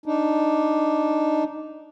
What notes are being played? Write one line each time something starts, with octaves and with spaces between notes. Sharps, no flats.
D4 D#4